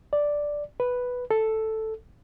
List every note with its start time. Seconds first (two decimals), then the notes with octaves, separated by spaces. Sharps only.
0.13 D5
0.80 B4
1.31 A4